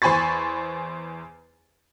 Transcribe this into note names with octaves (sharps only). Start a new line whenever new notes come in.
E2 C5 G#5 B5 C#6 A6